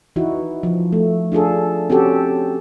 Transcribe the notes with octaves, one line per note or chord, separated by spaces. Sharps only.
E3 D#4 E4 F#4
F3
A3
D4 F4 G#4 A4
C4 C#4 F#4 G4 A4